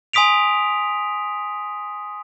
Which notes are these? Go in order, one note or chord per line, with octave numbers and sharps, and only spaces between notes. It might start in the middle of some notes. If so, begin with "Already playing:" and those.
G#5 C6 D#6 B6 D7 F7